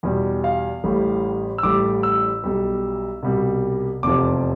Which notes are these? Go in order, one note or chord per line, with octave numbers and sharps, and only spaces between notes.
E2 B2 G3
F5
A1 A2 G3
E6
A1 A2 G3 D6
E6
B1 B2 G3
C2 B2 G3
F1 E2 C3 F3 D6